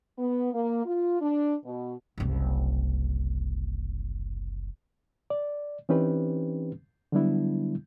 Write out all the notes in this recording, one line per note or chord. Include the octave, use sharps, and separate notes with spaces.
B3
A#3
F4
D4
B2
F#1 C2
D5
E3 C4 C#4 D#4 G4 B4
D3 F#3 G3 B3 D4 E4